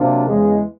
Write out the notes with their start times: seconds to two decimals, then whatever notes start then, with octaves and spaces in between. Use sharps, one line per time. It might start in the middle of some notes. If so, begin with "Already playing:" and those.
Already playing: C3 F#3 A#3 D4 F4
0.26 E2 C#3 E3 G#3